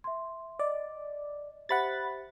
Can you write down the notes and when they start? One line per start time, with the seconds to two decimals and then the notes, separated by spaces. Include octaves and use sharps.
0.04 E5 C6
0.59 D5 D#5
1.69 G4 C5 E5 F#5 B5 A6